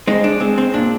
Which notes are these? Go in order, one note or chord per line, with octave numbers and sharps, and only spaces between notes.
G#3 C4 D#4
D4
G#3 C4
C4
A#2 D4